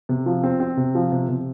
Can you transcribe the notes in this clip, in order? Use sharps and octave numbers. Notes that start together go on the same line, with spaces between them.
C3
F3
C4
C4
C3
F3
C3
C3